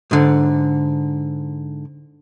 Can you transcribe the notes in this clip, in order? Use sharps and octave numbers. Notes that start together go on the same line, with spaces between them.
G#2 D3